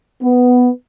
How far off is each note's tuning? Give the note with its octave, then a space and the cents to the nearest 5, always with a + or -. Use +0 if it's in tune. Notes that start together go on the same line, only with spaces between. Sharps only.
B3 +5